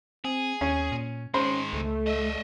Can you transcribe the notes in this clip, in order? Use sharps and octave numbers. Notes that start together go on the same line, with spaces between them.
C4 G#4
D#2 C#4
A#2
D#3 G#3 C#4 C5
C#2 A3
D#5 E5